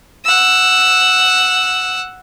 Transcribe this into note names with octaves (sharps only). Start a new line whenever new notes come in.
F#5 E6